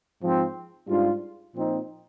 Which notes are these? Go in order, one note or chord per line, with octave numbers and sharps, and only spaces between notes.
G#2 F3 C4
G#2 G3 D4 F4
A#2 F3 C4 D#4